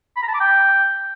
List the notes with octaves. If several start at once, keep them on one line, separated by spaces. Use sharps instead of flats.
B5
A#5
A5
D6
G5